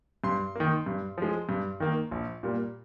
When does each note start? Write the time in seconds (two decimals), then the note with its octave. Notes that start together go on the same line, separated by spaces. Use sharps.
0.24 G2 C6
0.55 D#3 A#3
0.86 G2
1.18 F3 G#3
1.49 G2
1.80 D#3 A#3
2.11 A#1
2.43 A#2 G3 A#3